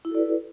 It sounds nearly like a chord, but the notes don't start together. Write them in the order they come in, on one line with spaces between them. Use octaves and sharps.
E4 F#4 A4 D5 B4